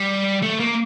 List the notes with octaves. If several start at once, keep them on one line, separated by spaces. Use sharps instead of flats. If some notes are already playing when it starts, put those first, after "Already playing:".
Already playing: G3
A3
A#3